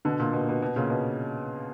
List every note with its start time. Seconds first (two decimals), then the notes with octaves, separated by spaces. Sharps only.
0.05 B2 D3
0.19 A#2
0.33 B2
0.41 A#2
0.49 B2
0.62 B2
0.76 A#2 C#3
0.90 B2